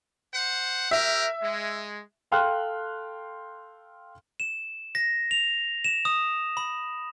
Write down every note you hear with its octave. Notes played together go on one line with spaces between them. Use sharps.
C5 F#5
G4 A#4 E5
G#3
A4 F5 G5 C6 F6 F#6
E7
A#6
F7
E7
D#6
B5